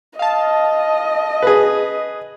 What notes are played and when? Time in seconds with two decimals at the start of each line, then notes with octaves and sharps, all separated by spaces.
0.19 D#5 F5 A5
1.43 G#4 B4